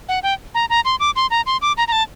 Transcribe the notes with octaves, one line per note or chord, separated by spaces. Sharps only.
F#5
G5
A#5
A#5
C6
D6
C6
A#5
C6
D6
A#5
A#5
A5